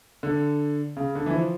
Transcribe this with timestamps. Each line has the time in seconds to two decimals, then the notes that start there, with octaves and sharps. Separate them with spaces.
0.23 D3
0.97 C#3
1.15 D3
1.26 E3
1.33 F3